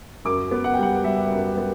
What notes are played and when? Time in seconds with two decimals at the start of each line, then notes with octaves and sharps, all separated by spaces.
0.25 F#2 D6
0.51 B3
0.64 F#5
0.74 G5
0.78 G3 F#5
1.04 G3 E5
1.31 F#2
1.57 B3